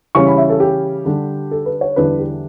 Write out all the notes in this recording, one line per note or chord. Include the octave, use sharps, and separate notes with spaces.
C#3 E3 G3 C#4 C#6
B5
E5
A4
G4
D3 G3 D4
A4
B4
C#5
E2 D3 G3 D4 B4
G4